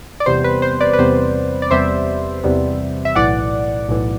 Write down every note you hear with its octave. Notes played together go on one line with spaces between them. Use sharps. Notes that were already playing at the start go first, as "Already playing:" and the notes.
D5
E2 C3 G3 B3 C5
B4
C5
B4 D5
B4
E2 C3 G3 B3 C5
D5
E2 C3 G3 B3 C5 E5
E2 C3 G3 B3
E5
B1 A2 E3 D5 F#5
B1 A2 E3